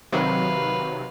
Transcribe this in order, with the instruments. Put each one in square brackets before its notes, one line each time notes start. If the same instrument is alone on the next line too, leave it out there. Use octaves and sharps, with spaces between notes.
[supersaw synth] C3 D#3 F#3 [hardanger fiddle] B4 F5